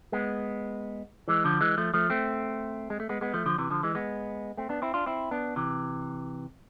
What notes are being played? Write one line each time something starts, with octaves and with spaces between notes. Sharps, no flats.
G#3 B3
E3 G#3
D3 F3
E3 G#3
F3 A3
F3 A3
A3 C4
G#3
A3
G#3 B3
G#3 B3
F3 A3
D3 F3
C3 E3
D3 F3
E3 G#3
G#3 B3
A3 C4
B3 D4
C4 E4
D4 F4
C4 E4
B3 D4
C3 E3